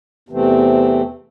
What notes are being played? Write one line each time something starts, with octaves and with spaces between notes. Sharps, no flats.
E2 C3 E3 A3 C4